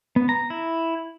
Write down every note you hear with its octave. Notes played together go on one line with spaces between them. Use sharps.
B3
A#5
E4